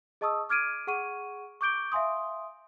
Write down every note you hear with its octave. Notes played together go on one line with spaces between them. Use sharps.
G#4 D#5 A5 C#6 D#6 E6
D6 F6 G#6 D7 D#7
G#4 F#5 C#6 D#7
C#6 D6 G6 D7 G7
E5 F5 G#5 C6 D#6